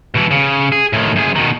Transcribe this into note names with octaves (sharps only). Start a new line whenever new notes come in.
B2 E3
C#3
G#4
A2 D#3
F#2 G#4
B2 D#3